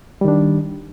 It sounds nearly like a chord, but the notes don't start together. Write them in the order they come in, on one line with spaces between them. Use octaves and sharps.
G3 D#3 D4